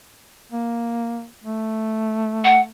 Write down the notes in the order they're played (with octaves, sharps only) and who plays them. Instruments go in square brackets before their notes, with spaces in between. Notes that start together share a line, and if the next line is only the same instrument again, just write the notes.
[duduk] A#3
A3
[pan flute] F#5